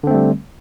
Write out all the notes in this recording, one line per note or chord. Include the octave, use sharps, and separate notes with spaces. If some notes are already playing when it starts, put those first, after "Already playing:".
D3 G3 A3 C4